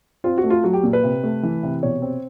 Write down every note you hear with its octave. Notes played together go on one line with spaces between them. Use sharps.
C4 F4
F#4
A3
F4
F#3 F#4
G4
A#2
B4
C3
A3
E3
C3
B2 C#5
C4